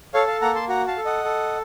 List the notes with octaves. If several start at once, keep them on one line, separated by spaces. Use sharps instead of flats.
A4 C#5 F5
F5 A5
A#3 F#5 A#5
A5 C6
F#4 F#5 A#5
F5 A5
A4
D#5 F#5
A4